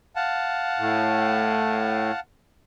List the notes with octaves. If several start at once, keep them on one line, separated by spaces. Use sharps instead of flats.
F5 F#5 A5
A2